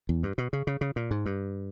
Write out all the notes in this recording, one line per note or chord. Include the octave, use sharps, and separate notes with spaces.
E2
G2
B2
C#3
C#3
C#3
A#2
G#2
G2